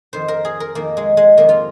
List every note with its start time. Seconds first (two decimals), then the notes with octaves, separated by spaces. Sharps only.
0.13 F2 D#3 C5
0.28 A#4
0.45 G#4
0.60 A#4
0.75 F2 D#3 A#3
0.97 G#3
1.17 G#3
1.37 F2 C3 D#3 A#3
1.49 F4